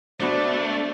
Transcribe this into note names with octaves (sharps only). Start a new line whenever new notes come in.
A3 B3 D4 F#4 C5 D5